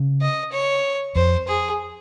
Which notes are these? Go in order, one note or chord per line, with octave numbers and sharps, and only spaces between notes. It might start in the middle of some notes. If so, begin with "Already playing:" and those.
Already playing: C#3
D#5
C#5
F2 C5
G#4